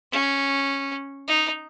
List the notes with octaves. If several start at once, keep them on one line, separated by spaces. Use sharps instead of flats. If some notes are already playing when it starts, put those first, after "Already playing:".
C#4
D#4